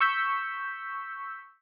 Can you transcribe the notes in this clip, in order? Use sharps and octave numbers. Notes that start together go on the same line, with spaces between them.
C#6 E6 G6 B6